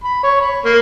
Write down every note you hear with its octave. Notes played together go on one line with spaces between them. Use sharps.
B5
C#5
B5
A#3